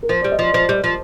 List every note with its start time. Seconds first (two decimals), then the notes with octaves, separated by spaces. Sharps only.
0.03 A#4
0.09 F3 C5
0.21 G3 D5
0.32 D#5
0.39 F3 D5
0.54 F3 C5
0.69 G3
0.84 F3